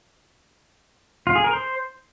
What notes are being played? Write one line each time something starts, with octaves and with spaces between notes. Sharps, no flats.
F4
G#4
A#4
C5